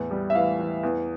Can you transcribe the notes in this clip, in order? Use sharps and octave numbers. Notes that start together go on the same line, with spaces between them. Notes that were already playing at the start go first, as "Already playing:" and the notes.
Already playing: E2 A2
G3
E5
E3 F5
E3
E2